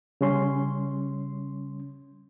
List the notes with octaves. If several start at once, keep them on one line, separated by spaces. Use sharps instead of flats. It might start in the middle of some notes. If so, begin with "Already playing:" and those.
C#3 G3 C#4 C6